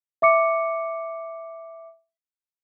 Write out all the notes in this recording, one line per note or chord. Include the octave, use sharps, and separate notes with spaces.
E5 D6 C#7